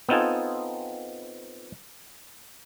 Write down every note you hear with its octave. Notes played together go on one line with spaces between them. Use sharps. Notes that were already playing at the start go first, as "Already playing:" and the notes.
B3 C4 D#4 F4 A4 G#5